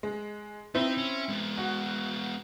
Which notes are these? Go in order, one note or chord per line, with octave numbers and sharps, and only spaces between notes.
G#3
C4 D#4 E4
C#4
G#3 B3
F#4